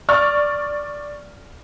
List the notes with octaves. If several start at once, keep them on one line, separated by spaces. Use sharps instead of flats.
D5 C#6 F6